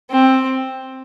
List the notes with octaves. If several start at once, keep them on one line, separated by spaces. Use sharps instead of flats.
C4